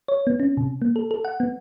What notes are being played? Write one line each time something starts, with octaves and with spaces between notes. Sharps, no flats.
C#5
B3
C#4
C3
A#3
A4
A4
F#5
B3